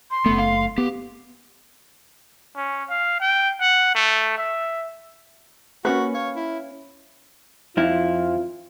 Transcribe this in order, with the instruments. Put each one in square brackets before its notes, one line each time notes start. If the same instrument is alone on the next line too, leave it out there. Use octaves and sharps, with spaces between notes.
[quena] C6
[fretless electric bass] F#1 A3 [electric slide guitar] B3
[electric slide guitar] F5
[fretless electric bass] B3 [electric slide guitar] G4
[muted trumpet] C#4
F5
G5
F#5
A3
E5
[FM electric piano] A#3 C#6 [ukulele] C#4 D4 B4 [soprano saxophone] F#4
[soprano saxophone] C#5 [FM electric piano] F5
[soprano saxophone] E4
[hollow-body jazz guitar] F2 F3 E4 [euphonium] F4